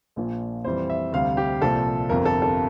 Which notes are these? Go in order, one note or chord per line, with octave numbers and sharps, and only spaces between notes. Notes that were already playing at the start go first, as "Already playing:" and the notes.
A#1 A#2 F3
F2 E3 G3 C4 C5
E5
D2 C3 G3 C4 F5
G4
C2 A#2 F3 C4 A4
G1 F2 C3 F3 A#4
A4
A4